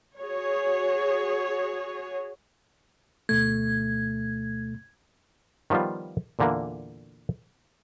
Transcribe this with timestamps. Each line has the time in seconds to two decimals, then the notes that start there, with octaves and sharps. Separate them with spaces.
0.19 F#4 G#4 C#5
3.29 D2 B2 A3 G#6
5.70 D#3 F3 G3 B3 F4
6.39 E2 A#2 D3 E3 A#3